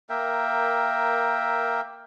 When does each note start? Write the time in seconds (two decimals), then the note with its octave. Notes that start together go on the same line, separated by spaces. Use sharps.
0.09 A#3 A#4 E5 G5